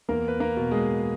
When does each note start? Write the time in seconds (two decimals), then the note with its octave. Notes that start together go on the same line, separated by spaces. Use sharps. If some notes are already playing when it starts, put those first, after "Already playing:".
0.09 E2 A#3 A#4
0.28 B4
0.40 A#3 A#4
0.57 B2
0.71 G#3 G#4